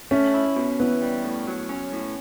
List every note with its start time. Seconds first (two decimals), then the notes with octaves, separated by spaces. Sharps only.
0.11 A3 C#4
0.34 E4
0.56 B2
0.79 E3 B3
1.01 G3
1.24 A2
1.47 F#3
1.69 C#4
1.92 A2